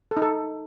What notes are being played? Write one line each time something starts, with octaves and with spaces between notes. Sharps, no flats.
A4
D#4
A4